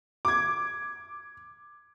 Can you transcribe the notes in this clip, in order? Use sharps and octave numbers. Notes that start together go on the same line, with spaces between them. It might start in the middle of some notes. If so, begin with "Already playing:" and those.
D6 G#6